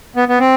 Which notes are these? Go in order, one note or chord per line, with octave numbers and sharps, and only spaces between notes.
B3
B3
C4